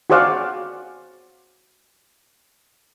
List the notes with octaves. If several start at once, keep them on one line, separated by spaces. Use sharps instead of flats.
F#4 G#4 C5 D5 F5 F#5